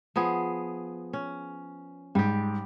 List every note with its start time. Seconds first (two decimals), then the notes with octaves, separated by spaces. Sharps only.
0.16 F3 B3 G#4
1.13 C#4
2.15 G#2 G3 G4